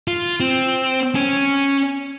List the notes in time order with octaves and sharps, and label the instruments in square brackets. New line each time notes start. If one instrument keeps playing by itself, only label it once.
[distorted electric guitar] F4
C4
C#4